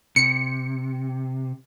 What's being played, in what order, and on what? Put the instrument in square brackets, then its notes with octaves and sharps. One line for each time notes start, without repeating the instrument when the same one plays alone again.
[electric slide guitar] C3 [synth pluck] C#7